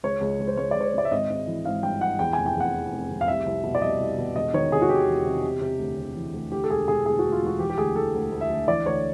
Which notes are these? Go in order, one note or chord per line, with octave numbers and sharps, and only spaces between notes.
C#2 C#5
C#2
C#2
C5
C#2 C#5
C#2 D5
C#5
C5
C#2 D5
E5
G#1 D#5
G#1
E3
G#1 F5
G2 G5
E3 F#5
E2 G5
F1 G#5
G5
E2 F#5
E3
F1
F1
F5
C2 E5
C2
B2
D5
C2 D#5
C2
B2
E1 D#5
D#3 C#5
C3 G#4
F#4
C3 G4
E2
C3
C3
C3
D2
C3
E3
D2
D2 G4
A4
E1 G#4
E1 G#4
D2 G#4
D2 F#4
F4
E1 F#4
E3 G4
G4
D2 G#4
E3 A4
D2
D2
E5
D2
E3 D5
D2 C#5